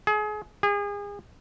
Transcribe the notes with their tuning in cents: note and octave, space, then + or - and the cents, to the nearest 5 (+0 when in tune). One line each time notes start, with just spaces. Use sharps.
G#4 +30
G#4 -35